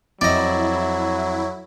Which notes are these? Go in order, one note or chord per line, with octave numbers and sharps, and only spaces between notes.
F2 F#3 E4 D5 D#5